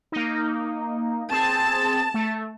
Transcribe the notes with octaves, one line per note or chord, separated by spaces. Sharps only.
A#3 D#4
C4 G#4 A5
A3